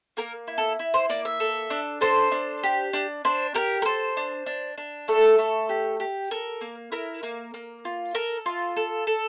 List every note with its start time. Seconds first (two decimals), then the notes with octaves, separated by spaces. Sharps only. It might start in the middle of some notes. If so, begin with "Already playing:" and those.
0.17 A#3 A#4
0.48 E4
0.58 A4
0.79 E4
0.94 C5
1.09 A#3 D5
1.25 E5
1.40 A4
1.70 D4
2.01 A4 C5
2.32 D4
2.63 G4
2.93 D4
3.25 D4 C5
3.55 G4 A#4
3.82 A#4
3.85 A4 C5
4.17 D4
4.46 D4
4.78 D4
5.08 A3 A4
5.38 A3
5.69 G4
6.00 G4
6.31 A4 A#4
6.61 A#3
6.92 E4 A#4
7.23 A#3
7.54 A#3
7.85 F4
8.15 A4 A#4
8.46 F4
8.77 A4
9.07 A4